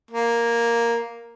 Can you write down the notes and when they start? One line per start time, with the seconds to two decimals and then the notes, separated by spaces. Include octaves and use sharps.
0.11 A#3